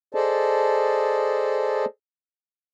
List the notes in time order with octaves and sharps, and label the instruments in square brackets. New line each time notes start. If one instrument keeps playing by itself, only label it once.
[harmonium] G#4 A4 C5 D5 D#5 A5